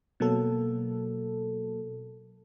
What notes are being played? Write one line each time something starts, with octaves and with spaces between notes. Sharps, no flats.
B2 F#3 A#3 A4